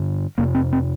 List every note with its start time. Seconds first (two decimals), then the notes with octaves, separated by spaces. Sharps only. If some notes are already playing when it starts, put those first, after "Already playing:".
Already playing: G2 D3
0.38 F2 C3 A#3
0.55 C4
0.73 C4